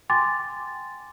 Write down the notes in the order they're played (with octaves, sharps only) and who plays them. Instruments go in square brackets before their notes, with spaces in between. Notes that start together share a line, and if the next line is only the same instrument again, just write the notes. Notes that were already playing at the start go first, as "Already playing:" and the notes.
[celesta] G5 G#5 C6 D6 A6